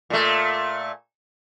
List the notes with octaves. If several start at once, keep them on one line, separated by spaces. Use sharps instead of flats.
A#2 A3